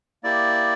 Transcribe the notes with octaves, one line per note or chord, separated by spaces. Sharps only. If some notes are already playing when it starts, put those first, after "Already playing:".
A#3 E4 G4 D5